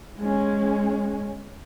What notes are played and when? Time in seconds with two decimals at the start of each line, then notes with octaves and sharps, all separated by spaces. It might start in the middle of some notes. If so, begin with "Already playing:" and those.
0.18 G#3 C#4